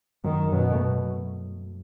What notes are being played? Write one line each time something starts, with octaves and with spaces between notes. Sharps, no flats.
F#2 D#3 F#3
F#2 B2 F#3
A3